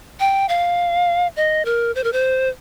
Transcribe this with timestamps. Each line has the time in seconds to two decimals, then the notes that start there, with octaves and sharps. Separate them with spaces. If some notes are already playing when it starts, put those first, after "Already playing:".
0.20 G5
0.49 F5
1.36 D#5
1.65 A#4
1.95 C5
2.04 A#4
2.13 C5